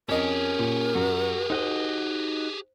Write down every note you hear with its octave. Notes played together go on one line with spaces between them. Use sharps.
F2 C#4 G4 G#4 A#4 D#5
A#2
F#2 F#4
D#4 F#4 C5 D#5